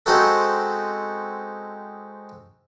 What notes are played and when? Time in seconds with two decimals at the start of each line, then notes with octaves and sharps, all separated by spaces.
0.06 G#3 C4 C#4 D#4 F#4 A4